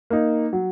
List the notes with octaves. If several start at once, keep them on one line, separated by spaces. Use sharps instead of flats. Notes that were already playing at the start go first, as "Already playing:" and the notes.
A#3 D#4
F#3